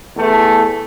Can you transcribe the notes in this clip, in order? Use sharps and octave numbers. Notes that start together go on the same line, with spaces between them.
E2 E3 A3